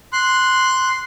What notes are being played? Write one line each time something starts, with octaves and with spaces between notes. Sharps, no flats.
C6 F#6